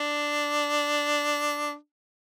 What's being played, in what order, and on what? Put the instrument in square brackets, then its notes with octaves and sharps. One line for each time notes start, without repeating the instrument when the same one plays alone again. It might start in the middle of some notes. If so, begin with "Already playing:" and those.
Already playing: [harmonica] D4